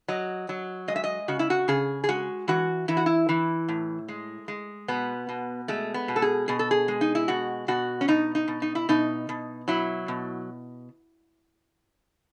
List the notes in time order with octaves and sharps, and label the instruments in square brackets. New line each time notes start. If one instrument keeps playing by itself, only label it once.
[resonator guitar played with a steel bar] F#3 D#5
F#3
G#3 D#5
E5
D#5
C#3 F#4
E4
F#4
C#3 G#4
G#4
G#3 F#4
E3 F#4
E3 E4
F#4
E4
E3
A2
G#3
G#3
B2 B3
B2
G#3 A3
B3
B2
A4
G#4
B2 G#4
A4
G#4
G#3
D#4
E4
B2 F#4
B2 F#4
C#4
B2 D#4
D#4
B2
D#4
E4
B2 D#4
B2
F#3 E4
B2